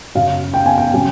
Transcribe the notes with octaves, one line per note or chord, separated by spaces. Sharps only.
F#2 C#3 F#3 F5
G5
G#5
G5
C#3 F#3